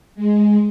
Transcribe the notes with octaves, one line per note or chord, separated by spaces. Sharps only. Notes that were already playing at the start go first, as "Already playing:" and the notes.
G#3